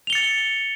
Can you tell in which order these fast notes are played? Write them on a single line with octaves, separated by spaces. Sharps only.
F7 G7 C#7 A6